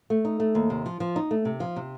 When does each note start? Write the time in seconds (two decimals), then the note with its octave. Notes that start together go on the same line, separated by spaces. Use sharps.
0.10 A3
0.25 D#4
0.40 A3
0.55 D#2
0.70 C3
0.86 F3
1.00 F3
1.16 D#4
1.31 A3
1.45 C3
1.60 F3
1.76 C3